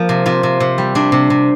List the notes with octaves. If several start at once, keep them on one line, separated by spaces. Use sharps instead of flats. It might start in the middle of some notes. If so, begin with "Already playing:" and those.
Already playing: F3 A#3
C3
C3 F4
C3
C3
G3
C3 D4
C3
C3